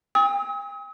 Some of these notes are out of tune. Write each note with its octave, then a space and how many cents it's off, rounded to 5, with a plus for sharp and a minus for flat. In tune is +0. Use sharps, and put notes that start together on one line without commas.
G5 +40 D#6 +45